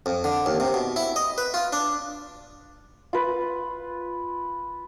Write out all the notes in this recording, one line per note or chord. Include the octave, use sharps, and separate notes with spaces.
F2
D3
D#2
C3
B2
E4
D#5
B4
F4
D4
F4 B4